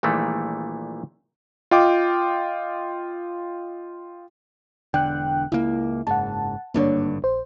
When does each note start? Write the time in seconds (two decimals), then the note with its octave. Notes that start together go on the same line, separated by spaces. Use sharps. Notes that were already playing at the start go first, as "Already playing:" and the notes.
0.03 A#1 A#2 D#3 E3 G3 A3
1.71 F4 D#5 G5 D6
4.94 E1 D3 G5 F#6
5.52 C#2 A#3 E4
6.07 F#1 G#2 F#5 A5
6.74 G#1 G2 D3 A#3 D4 C#5
7.22 A#1 C5